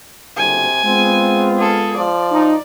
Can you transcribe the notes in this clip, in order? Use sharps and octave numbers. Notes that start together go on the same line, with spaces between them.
F#1 D2 C3 G#5
G#3 B3 C4 F4
G#4 A4
F3 D5
D#4